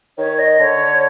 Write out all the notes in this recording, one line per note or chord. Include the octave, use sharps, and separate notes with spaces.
D#3 C#5
D#5
D3 C#5